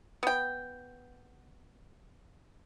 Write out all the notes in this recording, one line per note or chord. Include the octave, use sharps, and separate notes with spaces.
B3 G5